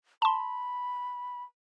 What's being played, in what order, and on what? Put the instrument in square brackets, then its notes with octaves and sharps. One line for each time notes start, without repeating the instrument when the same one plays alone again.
[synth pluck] A5 C6 [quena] B5